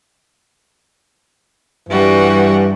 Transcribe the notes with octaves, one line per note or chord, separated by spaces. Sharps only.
G2 E3 G3 F#4